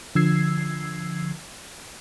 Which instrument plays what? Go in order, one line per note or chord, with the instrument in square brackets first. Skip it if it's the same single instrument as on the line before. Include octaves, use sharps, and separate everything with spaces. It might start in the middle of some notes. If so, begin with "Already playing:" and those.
[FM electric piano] D3 F3 E6 G#6 C7